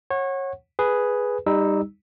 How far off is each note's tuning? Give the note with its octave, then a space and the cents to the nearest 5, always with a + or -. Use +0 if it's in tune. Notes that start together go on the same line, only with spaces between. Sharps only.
C#5 -25 F#5 +0
G#4 +0 B4 +0
G3 +20 D#4 +0 E6 -15